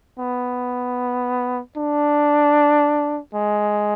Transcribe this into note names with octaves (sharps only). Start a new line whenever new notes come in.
B3
D4
G#3